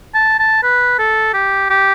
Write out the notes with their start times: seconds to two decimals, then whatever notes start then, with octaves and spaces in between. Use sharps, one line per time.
0.14 A5
0.39 A5
0.63 B4
0.99 A4
1.34 G4
1.70 G4